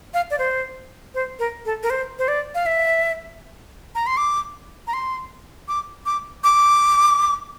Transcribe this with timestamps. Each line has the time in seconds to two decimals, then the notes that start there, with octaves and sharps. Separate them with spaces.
0.14 F5
0.31 D5
0.39 C5
1.15 C5
1.39 A#4
1.66 A4
1.83 A#4
1.90 C5
2.19 C5
2.28 D5
2.55 F5
2.66 E5
3.95 A#5
4.07 C6
4.17 D6
4.87 A#5
4.93 C6
5.68 D6
6.06 D6
6.44 D6